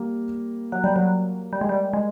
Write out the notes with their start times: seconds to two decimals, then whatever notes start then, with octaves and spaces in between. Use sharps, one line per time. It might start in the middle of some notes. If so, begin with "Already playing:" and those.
Already playing: G3 A#3
0.72 F#3
0.84 G3
0.96 F#3
1.53 G3
1.61 G#3
1.69 G3
1.93 G#3